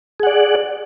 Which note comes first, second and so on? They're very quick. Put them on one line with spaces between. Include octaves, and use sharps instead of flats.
G#4 F#5 D5